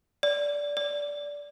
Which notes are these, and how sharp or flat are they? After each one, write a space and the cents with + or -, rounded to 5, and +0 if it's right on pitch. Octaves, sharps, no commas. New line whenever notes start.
D5 -15
D5 -15